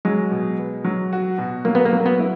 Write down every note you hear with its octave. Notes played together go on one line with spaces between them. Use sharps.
F#3 G#3
B2
B3
F#3
F#4
B2
F#3 A#3
B3
A#3
F#3
B3
E4